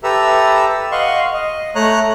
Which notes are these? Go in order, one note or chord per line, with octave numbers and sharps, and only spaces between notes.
G4 A4 B4 E5 A#5 E6
D#5 F5 F#5 C6 C#6
D#5
A3 C#5 A#5 F#6